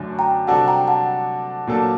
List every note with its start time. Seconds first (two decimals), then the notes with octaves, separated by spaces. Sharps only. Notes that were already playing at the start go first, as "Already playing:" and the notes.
Already playing: F#2 D3 A3 D4
0.19 G5 A#5
0.48 C3 G3 D4 F#4 A4 F#5 A5
0.68 G5 A#5
0.87 F#5 A5
1.67 A#2 F#3 A#3 D4 A4